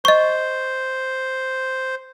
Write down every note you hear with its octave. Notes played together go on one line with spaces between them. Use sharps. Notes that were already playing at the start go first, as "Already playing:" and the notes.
C5 D#5 C#6